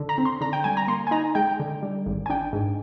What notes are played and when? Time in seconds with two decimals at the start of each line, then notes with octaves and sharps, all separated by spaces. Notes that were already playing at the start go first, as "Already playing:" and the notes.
Already playing: D3
0.09 A#5
0.18 C4
0.25 C6
0.41 D3 A#5
0.53 G5
0.64 G3 G#5
0.77 A#5
0.88 A#3 C6
1.07 G#5
1.11 D#4 A#5
1.35 G#3 G5
1.60 D3
1.83 G3
2.06 G#1
2.26 G#5
2.30 D4 G5
2.53 G#2